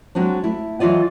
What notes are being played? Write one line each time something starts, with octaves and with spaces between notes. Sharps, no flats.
F#3 G#3 C4 D4
A3 E4
E3 F#3 F4 D5 D#5